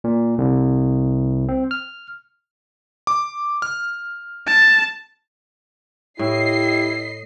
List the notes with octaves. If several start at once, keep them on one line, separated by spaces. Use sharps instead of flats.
A#2
C2
C4
F6
D6
F6
A5
A2 E4 G4 D#5 C7